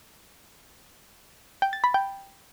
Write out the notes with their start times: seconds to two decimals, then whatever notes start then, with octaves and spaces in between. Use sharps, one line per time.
1.62 G5
1.73 A6
1.84 B5
1.94 G5